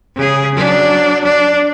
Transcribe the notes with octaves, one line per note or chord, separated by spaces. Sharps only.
C#3 G#4
F#3 D4
D4